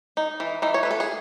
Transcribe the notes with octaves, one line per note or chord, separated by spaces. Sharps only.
D#4
E3
E3 D#4
C#5
A3 B4
A4
G#4